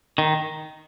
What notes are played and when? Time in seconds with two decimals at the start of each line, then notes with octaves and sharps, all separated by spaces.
0.18 D#3